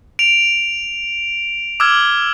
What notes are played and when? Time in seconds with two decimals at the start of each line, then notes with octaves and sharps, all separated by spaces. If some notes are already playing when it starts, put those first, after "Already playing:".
0.19 D7 F7
1.80 D6 E6 F6 G#6